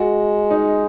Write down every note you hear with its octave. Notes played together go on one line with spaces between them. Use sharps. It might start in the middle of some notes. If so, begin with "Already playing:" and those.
Already playing: G#3 F#4
D#4